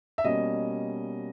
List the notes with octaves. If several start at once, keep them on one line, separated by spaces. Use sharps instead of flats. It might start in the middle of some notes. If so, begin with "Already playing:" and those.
E5
B2 G3 A#3 C#4 D#5